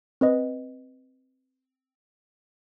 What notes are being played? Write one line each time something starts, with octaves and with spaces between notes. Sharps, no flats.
C4 B4 D#5